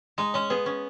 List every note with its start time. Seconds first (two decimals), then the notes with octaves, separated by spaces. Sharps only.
0.18 G#3 D#4
0.34 G#3 C#4
0.50 B3 G#4
0.66 C#4